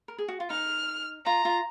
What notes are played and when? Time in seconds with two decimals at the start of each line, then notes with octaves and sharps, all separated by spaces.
0.08 A#4
0.18 G#4
0.28 F#4
0.40 F4
0.50 D#4 F6
1.25 F4 A#5
1.45 F4